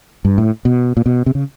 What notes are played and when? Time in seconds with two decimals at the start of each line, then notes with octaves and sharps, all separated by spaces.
0.25 G2
0.38 A2
0.65 B2
0.97 A#2
1.06 B2
1.26 C3
1.35 C#3